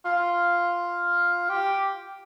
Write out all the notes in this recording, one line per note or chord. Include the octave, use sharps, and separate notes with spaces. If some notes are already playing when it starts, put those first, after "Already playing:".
F4
G4